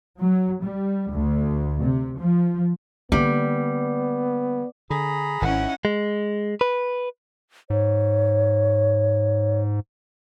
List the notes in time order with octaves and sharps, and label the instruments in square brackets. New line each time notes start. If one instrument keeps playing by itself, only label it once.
[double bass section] F#3
G3
D2
C3
F3
[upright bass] D3 A#3 [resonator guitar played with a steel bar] G3 [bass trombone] B3
[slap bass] D3 [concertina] G#4 A#5 B5
[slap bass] G#1 D#3 [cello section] C#4 D#4 E4 [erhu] F#5
[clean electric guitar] G#3
B4
[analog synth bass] G#2 [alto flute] C#5